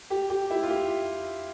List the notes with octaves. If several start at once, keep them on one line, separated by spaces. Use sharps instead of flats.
G4
G4
E4
F4
G4